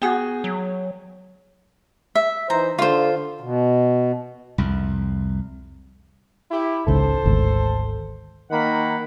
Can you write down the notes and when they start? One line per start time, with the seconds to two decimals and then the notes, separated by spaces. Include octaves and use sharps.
0.02 B3 F#4 G#4 G5
0.44 F#3
2.15 E5
2.50 E3 D#4 C5 A#5
2.79 D3 F4 C5
3.41 B2
4.58 C2 F2
6.51 E4 G4
6.87 G#1 C#2 G#2 A4 C5
7.26 G#1 D2
8.51 D#3 A#3 F#5 B5